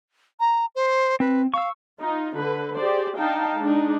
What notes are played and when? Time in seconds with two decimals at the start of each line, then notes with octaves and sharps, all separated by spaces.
0.40 A#5
0.75 C5
1.20 C4 B4
1.54 F5 C#6 E6
2.00 D#4 F4
2.38 D3 B4
2.77 G4 G#4 C5 D5
3.17 D4 D#4 F5 G5 A5
3.59 G#3 D4 D#4